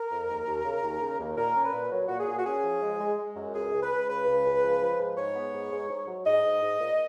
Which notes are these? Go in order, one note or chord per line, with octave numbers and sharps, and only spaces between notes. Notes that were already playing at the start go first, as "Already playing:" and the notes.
Already playing: A#4
F2
D#2
D#2
C#3
D#2
C#3
D#2
A#2 A#4
C#4
B4
A#2
F#3
A#2 F#4
G#4
A#2
F#4
C#4 G#4
F3
G#3
G#3
G#3
F#2
C#2 G#4
C#2
B4
C#2
C#3 B4
C#2
C#2
F3
F3
G#2
G#2 C#5
B3
G#2
G#2
G#2
F#3
G#2 D#5
G#2
G#2
A#2